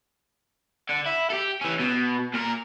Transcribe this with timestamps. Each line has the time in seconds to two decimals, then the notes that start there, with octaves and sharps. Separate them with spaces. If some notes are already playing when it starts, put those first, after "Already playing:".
0.89 D3
1.06 E4
1.30 G4 A4
1.61 E3 C#4
1.80 B2
2.34 A#2 A#4